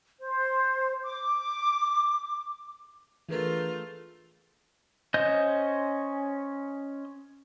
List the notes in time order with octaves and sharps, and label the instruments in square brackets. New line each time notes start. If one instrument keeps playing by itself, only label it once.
[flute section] C5
D6
[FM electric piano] E3 A#4 [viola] A3 F4 [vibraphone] D4 G#4 B4
[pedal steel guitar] C#4 C5 D#5 G6